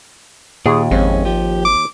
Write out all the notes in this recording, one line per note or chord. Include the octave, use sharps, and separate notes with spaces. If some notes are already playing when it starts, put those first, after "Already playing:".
D#2 A#2 G#4
G#1 F2 G#3 C4 C#4
F3 G4
D6